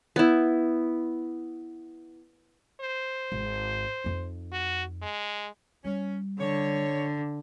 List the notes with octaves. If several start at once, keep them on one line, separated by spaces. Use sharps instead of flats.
B3 E4
C5
G#1
F2 D#4
F#4
G#3
G3 C#4
D3 C#5